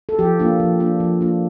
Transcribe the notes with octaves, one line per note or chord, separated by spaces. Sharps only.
A4
F3 G4
A#3 D4 F4
F3
A#3 D4 F4
F3
A#3 D4 F4